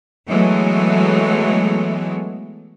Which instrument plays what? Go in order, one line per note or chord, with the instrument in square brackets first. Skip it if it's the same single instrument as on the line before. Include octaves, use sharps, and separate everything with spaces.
[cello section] E3 F#3 G#3 A3 B3